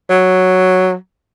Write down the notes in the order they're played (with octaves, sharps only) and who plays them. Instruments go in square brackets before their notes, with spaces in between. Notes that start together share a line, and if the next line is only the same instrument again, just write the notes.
[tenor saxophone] F#3